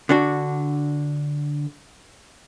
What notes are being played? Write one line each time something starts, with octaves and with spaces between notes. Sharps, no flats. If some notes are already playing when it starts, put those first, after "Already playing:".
D3 D4 F#4